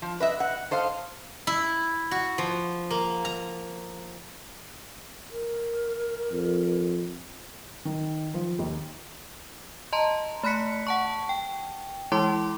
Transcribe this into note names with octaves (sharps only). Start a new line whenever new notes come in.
F3
B4 D#5 E5
F#5
A4 C5 D#5 F5
E4
F#4
F3
A#3
A#5
A#4
F2
D#3
F3
D#2
D#5 A5 A#5 C6
A3 B5 F#6 B6 C#7
F#5 A5 C#6
G5
E3 G#3 E4 A5 C6 D6